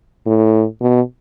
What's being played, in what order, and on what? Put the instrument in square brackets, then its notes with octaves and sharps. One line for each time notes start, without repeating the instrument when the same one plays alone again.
[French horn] A2
B2